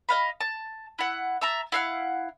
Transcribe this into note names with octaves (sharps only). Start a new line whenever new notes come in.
D#5 F5 B5
A5
E4 F#5
E5 A5 A#5
E4 F5 F#5